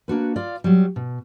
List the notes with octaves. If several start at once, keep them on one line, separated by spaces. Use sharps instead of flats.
A#3 D4 F#4 B4
F4 D5 F5
F#3 G3
B2